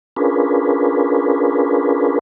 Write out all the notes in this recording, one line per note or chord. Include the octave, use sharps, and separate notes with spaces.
C#4 D4 F4 G#4 A#4 B4